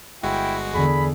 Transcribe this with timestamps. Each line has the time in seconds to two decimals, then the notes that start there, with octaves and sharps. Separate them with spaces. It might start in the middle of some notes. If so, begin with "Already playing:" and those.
0.23 G1 G#3 E4 F#4 G5
0.74 E2 D3 G#4 B5